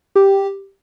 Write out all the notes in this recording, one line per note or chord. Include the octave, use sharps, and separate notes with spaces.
G4